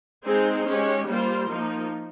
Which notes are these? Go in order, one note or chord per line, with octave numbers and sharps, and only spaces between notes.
G#3 C4 D#4 G#4 C5
G#3 C#4 G4 C#5
G3 A#3 F4 C5
F3 A#3 D#4